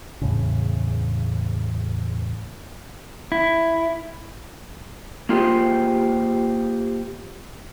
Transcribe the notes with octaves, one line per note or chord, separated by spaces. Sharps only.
E2 A2 C#3
E4
A#3 F4 G4 G#4 C5